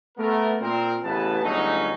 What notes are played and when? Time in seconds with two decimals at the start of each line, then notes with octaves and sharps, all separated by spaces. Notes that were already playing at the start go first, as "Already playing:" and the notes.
0.18 A3 B3 A#4
0.61 A#2 C4 A#4
1.03 A1 C#3 E3 B3 B4 A5
1.43 G1 F#3 G#3 A3 C#4 D#4